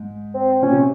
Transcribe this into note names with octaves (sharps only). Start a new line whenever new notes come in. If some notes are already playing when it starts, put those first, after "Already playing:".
Already playing: G#2
C4
A#2 C#4
C3